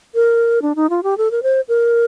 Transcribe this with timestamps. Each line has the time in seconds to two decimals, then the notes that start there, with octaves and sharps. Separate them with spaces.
0.15 A#4
0.62 D4
0.76 D#4
0.90 F4
1.03 G4
1.18 A4
1.31 A#4
1.43 C5
1.69 A#4